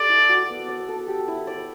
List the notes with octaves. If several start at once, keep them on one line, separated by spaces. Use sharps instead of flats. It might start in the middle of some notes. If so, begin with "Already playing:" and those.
Already playing: G4 A4 D5
E4
F#4
B3
D5
A4
G4
E4
D5